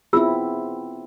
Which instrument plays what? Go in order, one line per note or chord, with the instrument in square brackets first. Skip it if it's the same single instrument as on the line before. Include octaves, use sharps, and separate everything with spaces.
[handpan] B3 C4 E4 [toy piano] F4 G#4 E6